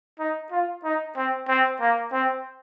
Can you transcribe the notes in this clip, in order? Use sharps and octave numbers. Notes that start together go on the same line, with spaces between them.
D#4
F4
D#4
C4
C4
A#3
C4